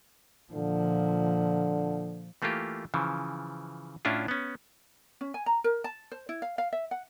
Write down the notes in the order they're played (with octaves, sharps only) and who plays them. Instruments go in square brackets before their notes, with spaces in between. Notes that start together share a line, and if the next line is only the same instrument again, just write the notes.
[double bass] A#2 F3 [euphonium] D3
[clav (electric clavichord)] E3 A3 A#3 F4 G4
C#3 E3 F3
A2 C#4 D4 E4 F4
B3 C#4
[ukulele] C#4
G#5
A#5
A#4
A5
C5
E4
F5
F5
E5
F#5